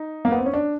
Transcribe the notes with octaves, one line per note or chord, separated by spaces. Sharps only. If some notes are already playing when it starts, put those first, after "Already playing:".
Already playing: D#4
A#3
B3
C4
C#4
D4